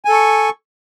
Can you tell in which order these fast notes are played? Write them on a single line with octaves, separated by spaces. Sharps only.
G#5 A4 C#6